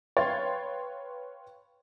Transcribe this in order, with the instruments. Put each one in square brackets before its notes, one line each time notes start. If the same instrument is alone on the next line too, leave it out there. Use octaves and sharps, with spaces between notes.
[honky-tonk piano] B4 C#5 F5 G5 C6 A6